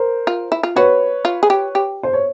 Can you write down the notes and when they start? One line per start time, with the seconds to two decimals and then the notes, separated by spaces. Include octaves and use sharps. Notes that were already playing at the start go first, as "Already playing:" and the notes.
Already playing: A#4 C5
0.27 F4
0.52 E4
0.63 F4
0.76 F#4 B4 C#5
1.25 F4
1.43 G#4
1.50 G4
1.75 G4
2.03 C5
2.13 C#5